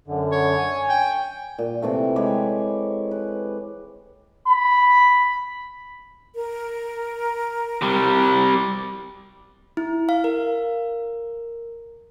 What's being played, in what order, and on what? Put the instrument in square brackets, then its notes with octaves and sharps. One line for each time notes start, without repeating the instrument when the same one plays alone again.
[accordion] F#2 D3
[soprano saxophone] C#5
[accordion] G#5
[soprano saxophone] G5
[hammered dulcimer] A#2
C3 E3 A3
G#3 G4 C#5 B5
B4
[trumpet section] B5
[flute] A#4
[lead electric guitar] C3 G3
[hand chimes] E4
F5
A#4